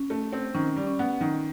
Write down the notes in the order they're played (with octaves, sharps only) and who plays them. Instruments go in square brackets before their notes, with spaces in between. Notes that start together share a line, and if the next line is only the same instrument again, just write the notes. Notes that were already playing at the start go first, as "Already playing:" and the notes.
Already playing: [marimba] C#4
[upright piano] A3
C4
[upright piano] D#3 [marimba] C#4
[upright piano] G3
[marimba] C#4
[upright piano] B3
[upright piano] D#3 [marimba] C#4